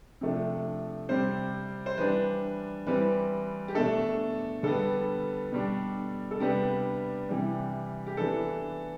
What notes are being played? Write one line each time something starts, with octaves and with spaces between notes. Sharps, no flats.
C3 F3 A3 D4
C3 G3 C4 C5
C5
E3 G3 D4 B4
E3 G3 C4 B4
G4
B2 A3 D4 A4
D3 G3 B3 A4
B2 G3 D4
A4
C3 G3 B3 D4 G4
C3 E3 G3
G4
E3 B3 D4 A4